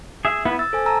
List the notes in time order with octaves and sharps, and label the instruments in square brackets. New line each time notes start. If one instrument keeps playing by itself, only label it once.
[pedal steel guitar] G#4 E5
B3 E4
[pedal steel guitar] E6 [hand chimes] A6
[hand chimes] A4 C5 G#5
A5 A#5 E6